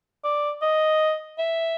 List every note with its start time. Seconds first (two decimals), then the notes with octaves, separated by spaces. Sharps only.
0.24 D5
0.62 D#5
1.39 E5